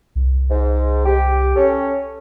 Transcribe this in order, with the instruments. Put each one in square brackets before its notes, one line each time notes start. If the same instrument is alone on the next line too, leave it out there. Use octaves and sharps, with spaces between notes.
[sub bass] C2
[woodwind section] G#2
G4
C#4 A4 C#5